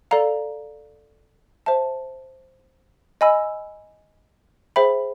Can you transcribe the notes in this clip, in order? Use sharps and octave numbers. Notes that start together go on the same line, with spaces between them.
A4 D5 F5 A#5
C5 E5 A5
D#5 G#5 B5 E6
G#4 C5 E5 G5 B5